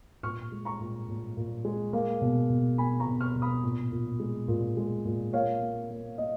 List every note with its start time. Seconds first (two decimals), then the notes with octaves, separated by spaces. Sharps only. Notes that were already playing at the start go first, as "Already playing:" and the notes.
0.23 A#2 C#6 F6
0.52 G#3
0.65 A#5 C#6
0.80 A#2
1.09 A#2
1.37 A#2
1.65 G#3
1.93 A#3
2.22 B2
2.50 B2
2.78 A#3 G#5 B5
3.00 A#5 C#6
3.07 B2
3.21 C#6 F6
3.35 B2
3.42 B5 D#6
3.64 A#2
3.92 A#2
4.20 G#3
4.48 A#2
4.77 G#3
5.05 A#2
5.33 A#3 C#5 F5
5.61 A#3
5.91 A#3
6.18 A#3 D#5